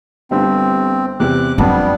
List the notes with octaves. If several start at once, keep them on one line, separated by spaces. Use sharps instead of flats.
G1 G3 C4 D4
E2 C3 D6 F#6
F2 F#3 G3 B3 D4